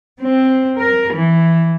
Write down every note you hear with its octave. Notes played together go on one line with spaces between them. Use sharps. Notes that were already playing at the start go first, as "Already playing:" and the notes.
C4
A#4
E3